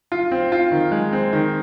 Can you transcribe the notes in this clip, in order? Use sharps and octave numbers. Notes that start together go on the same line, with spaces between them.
F4
C4
F4
D#3
G#3
C4
D#3